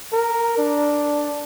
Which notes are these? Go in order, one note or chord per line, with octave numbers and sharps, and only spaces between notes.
A#4
D4